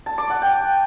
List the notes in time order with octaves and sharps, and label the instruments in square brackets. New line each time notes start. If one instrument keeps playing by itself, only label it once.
[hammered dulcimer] A5
D6
F#5
G5